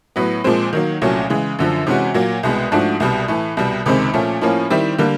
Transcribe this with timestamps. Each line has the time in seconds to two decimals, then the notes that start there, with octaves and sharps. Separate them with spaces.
0.16 A2 F#3 B3
0.44 A#2 F3 G#3 C4
0.73 D#3 F#3 A#3
1.02 C2 A#2 F#3 A3 C#4
1.30 C#3 E3 G#3
1.59 F#2 D3 F3
1.87 C3 E3 G#3 C#4 F#4
2.14 A#2 F#3 A#3
2.43 C2 B2 G#3 B3
2.72 G#2 F3 A3 D4 F#4
3.00 C2 B2 G3
3.28 A2 E3 A3
3.57 C2 B2 G3
3.86 C#2 C3 D#3 G#3 C4
4.13 A#2 F3 A3 C#4
4.41 A2 F3 A#3 C#4
4.70 D#3 G3 C4 E4 G4
4.98 D3 G3 A#3